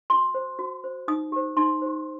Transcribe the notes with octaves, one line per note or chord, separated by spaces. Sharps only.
F#4 C6
C5
F#4
C5
D#4 D#6
G4 C5
D#4 C6
G4 C5